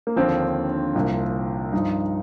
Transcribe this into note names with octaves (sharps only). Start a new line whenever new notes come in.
A#3
D#2 D3 F3 C4
C2 A#2 F3
G2 F3 D#4